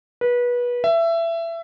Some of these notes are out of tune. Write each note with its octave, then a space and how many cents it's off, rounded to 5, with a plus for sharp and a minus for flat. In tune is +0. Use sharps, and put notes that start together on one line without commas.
B4 -25
E5 +20